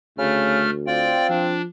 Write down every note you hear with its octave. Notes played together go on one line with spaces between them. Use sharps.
D2 C#3 A3 F6
C4 F4 D5 G5
F3 D4